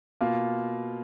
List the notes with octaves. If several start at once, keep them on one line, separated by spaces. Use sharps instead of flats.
B2 A#3 F4